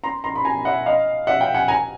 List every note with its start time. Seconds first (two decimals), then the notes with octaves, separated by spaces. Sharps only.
0.04 A#5 C6
0.24 A#5 C6
0.36 B5
0.45 G#5 A#5
0.65 E5 F#5
0.86 D#5 F5
1.27 E5 F#5
1.41 F5 G5
1.55 F#5 G#5
1.68 G#5 A#5